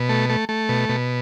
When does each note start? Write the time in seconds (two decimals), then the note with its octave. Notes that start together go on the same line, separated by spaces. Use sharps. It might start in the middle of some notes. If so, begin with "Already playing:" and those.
Already playing: B2
0.09 A3
0.29 A3
0.49 A3
0.69 B2
0.89 B2